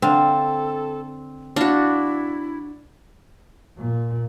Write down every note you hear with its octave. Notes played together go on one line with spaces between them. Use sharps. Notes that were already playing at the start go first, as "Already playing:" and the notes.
D3 C4 A4 F5
D4 E4 F#4 F5
A#2